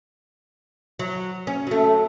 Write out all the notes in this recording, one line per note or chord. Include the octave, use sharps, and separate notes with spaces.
F#3
C#4
F#3 A3